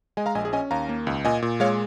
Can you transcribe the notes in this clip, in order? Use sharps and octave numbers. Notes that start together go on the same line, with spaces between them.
G#3 D#5 G#5
F5 A#5
A#1 D#5 G#5
G#4
C#4 D#5 G#5
D#2 F5 A#5
A#3
C#2
A#2 D#5 G#5
A#2
G#3 C#5 F5